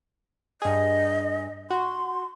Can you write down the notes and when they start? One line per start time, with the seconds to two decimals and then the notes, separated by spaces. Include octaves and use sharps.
0.62 G2 G#4 D#5
1.70 F#4 C6